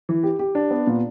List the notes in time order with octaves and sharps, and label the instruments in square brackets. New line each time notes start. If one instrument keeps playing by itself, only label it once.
[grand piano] E3
G4
G4
D4
B3
A#2